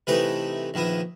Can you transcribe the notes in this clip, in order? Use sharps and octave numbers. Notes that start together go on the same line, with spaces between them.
C3 E3 A3 D#4 B4 D6
A#1 D#3 B3 E4 D#6